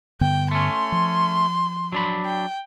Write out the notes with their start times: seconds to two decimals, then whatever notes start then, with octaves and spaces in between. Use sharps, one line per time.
0.21 G2 D3 B3 G5
0.51 A3 C#4 C6
0.92 F3
1.92 F#3 D4 B5
2.26 G5